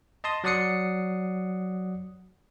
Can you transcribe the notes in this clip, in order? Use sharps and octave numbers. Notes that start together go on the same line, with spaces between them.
D#5 A5 C6 D#6
F#3 D5 F#5 D#6 C7 C#7